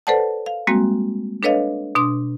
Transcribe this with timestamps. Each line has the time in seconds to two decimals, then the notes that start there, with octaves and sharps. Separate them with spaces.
0.07 A4 B4 C5 D5 F#5 A5
0.46 F5
0.67 G3 G#3 A#3 C4 F#4
1.43 D4 A4 B4 C#5 D#5 F5
1.95 B2 D4 C6 D6 D#6